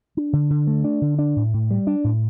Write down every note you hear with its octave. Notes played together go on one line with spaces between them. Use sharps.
D4
D3
D3
A3
D4
D3
D4
A2
A2
G3
D4
A2